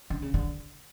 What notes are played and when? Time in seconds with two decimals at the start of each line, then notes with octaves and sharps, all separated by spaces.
0.10 D3
0.22 C#3
0.34 D3